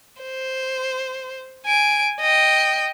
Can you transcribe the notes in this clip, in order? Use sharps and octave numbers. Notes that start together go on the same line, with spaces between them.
C5
G#5 D7
D#5 G5